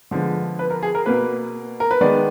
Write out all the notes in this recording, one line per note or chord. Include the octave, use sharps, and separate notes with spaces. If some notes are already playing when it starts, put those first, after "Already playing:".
D3 F3 G#3 B3
B4
A#4
G#4
A#4
B2 A#3 B4
A#4
B4
D#3 G#3 B3 D5